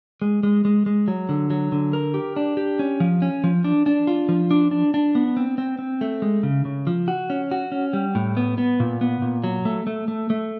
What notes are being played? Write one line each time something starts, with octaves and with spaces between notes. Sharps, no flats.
G#3
G#3
G#3
G#3
F#3
D3
F#3
D3
A#4
G4
D4
G4
C#4
F3
C#4
F3
D4
D4
F4
F3
D4
D4
D4
B3
C4
C4
C4
A3
G#3
C#3
C#3
F3
F#4
C#4
F#4
C#4
G3
A2
B3
B3
A#2
B3
A#2
F#3
A3
A3
A3
A3